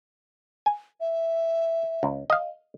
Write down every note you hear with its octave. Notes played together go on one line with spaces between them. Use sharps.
G#5
E5
C#2
D#5 F5